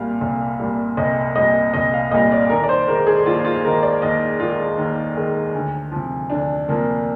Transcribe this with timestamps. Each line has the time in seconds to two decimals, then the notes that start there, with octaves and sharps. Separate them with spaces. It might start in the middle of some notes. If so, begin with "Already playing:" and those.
Already playing: C2 A#2 G3 F5
0.21 C2
0.60 A#2 G3
0.97 C2 D#5
1.35 A#2 G3 D#5
1.74 C2 D#5
1.94 F5
2.11 A#2 G3 D#5
2.32 D5
2.50 D#2 A#4
2.64 D5
2.69 C5
2.88 D#3 G#3 A#4
3.07 G#4
3.26 D#2 F4
3.45 F4
3.64 D#3 G#3 A#4
3.83 D5
4.02 D#2 D#5
4.40 D#3 G#3 F4
4.78 D#2
5.17 D#3 G#3
5.54 D2
5.92 C3 F3
6.30 D2 D4
6.68 C3 F3 A#3